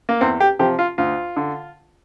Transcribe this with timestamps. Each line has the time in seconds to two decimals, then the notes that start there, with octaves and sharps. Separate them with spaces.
0.09 A#3
0.21 E2 C4
0.40 G4
0.59 C3 F3 G4
0.79 F4
0.98 D2 F4
1.37 D3